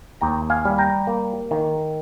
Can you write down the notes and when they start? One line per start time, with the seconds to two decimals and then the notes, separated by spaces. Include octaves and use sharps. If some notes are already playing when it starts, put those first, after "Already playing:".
0.21 D#2 G5 A#5
0.50 F5 G#5
0.65 G3
0.78 G5 A#5
1.07 A#3
1.51 D#3